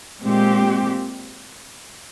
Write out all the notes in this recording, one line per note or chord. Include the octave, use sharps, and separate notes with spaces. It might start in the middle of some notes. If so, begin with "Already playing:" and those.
A#2 G#3 C4 G4